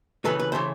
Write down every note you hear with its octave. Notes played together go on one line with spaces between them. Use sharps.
C#3 E3 A3 A4 B4
B4
C#3 E3 A3 C5